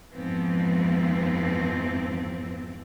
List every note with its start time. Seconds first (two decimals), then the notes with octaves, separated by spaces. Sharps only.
0.12 F2 G#2 E3 F3 B3 C4